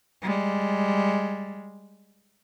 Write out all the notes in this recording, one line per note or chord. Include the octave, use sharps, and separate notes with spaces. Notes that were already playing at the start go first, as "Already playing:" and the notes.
G3 G#3